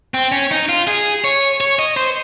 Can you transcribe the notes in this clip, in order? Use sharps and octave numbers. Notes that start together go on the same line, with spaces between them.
C4
C#4
D#4
F4
G#4
C#5
C#5
D#5
C5